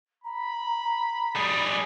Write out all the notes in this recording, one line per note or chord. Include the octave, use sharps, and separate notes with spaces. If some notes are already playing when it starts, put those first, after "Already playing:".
A#5 B5
G3 G#4